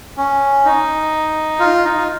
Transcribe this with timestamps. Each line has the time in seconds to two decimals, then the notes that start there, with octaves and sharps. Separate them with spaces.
0.18 C#4
0.65 D#4
1.60 F4
1.84 D#4
1.97 F4